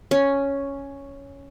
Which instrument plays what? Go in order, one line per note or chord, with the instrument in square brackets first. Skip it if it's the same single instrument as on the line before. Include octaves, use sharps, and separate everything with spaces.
[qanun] C#4